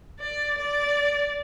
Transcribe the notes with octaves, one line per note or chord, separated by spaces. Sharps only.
D5
D5